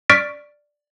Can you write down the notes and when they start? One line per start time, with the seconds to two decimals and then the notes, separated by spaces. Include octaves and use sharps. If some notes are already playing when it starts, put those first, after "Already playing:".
0.10 D5 C#6 F6 A6 B6 D7